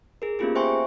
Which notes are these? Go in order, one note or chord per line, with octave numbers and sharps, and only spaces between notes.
G#4 A#4
A#3 B3 C#4 F4 G4 G#4
C5 E5 G5 G#5 C6 C#6